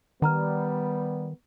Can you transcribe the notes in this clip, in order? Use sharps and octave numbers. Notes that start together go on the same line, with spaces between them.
D#3 G3 B3 F#5 A#5 F6